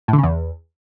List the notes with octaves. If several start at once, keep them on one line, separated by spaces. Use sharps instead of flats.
A2
D3
C#3
E2